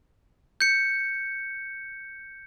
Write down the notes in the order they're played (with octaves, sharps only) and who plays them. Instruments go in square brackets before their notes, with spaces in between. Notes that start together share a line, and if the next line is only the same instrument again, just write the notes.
[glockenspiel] G6 C#7